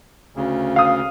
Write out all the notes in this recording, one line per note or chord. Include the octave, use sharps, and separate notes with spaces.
D2 C#3
F5 D#6